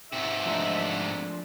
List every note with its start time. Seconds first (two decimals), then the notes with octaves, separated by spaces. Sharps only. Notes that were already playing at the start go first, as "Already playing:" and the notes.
0.13 G#2 C3 E5
0.46 F3 A3 D4